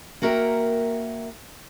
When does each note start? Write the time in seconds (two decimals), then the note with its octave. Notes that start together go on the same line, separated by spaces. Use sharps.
0.22 A#3 F#4 A#4 E5 F5 G5